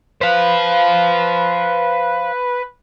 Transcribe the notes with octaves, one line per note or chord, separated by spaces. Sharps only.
B4 C5 F5